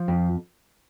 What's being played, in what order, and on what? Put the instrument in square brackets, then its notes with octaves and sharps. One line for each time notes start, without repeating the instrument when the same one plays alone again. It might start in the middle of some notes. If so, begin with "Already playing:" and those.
Already playing: [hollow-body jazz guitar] F3
F2